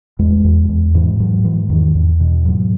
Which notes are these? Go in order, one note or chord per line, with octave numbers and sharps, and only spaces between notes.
E2 G#3
E2
E2
G#2 E3
G#2 F#3
G#2 E3
E2 D#3
E2
B2 E3
G#2 F#3